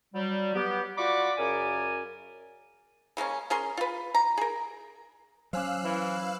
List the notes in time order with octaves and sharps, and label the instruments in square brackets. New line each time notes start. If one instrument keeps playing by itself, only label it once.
[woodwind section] F#3 G3
B3 G4
F4 F#4 D5 B5 C#6 D6
F#2 C#3 A#4 D5 G#5
[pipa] C#3 G#3 A#3 C#4
C#4 G#4 A#4 C6
F4 B4
A#5
G#4 A#4
[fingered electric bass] F#3 C#4 [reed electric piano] C5 G#5 D6 [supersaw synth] F5 E6 F#6
[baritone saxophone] E3 [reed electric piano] C5 E5